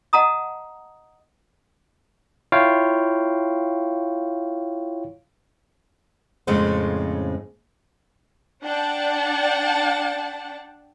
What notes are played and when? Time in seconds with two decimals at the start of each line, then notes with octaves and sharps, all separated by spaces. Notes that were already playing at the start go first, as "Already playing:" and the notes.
0.13 D#5 F#5 A5 A#5 D#6
2.52 E4 F4 C#5 F5 G5
6.47 F2 A2 C#3 G#3 A3 C4
8.63 D4 F#5 G5 A5